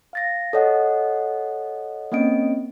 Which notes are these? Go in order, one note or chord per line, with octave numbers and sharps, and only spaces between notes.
F5 A6 A#6
A4 C#5 D#5 F#5
A#3 C4 C#4 D#5 D7